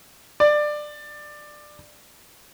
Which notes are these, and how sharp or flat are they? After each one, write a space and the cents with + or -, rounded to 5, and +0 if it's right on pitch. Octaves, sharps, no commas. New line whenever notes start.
D5 +20